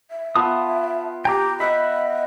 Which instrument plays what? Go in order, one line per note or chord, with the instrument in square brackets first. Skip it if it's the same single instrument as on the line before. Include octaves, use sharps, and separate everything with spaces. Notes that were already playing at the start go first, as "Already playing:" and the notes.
[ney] E5
[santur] B3 F4 [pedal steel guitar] A5 D#6
[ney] G4 [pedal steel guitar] G5 A#5 D6
[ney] D#5 [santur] E5 F#5 G5 [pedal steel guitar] B5